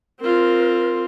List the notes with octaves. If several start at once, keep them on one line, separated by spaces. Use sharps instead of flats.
C4 F4 A#4